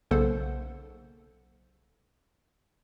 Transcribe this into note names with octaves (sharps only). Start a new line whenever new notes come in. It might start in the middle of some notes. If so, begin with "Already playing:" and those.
B1 C#3 A#3 A4 C5 F#5